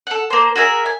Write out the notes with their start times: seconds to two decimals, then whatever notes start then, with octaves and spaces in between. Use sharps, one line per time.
0.07 A4 F#5
0.30 A#3 C5
0.56 F#4 G#4 A#4 E5
0.86 G#5